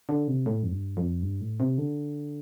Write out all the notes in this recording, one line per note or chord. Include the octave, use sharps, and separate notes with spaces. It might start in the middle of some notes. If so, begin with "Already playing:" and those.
D3
C3
A2
F2
G2
F2
G2
A2
C3
D3